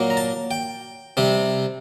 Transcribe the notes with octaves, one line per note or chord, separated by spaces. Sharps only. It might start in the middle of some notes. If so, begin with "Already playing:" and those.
Already playing: A#2 F#3 A#3
A#5
A5
G5
C3 G3 C4